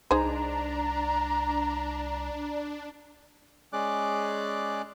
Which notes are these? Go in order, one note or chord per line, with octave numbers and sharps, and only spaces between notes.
C2 D4 D#4 G#4 C5 A#5
G#3 C#4 G#4 D5 D6 F#6